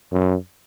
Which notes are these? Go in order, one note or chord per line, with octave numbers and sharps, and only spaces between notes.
F#2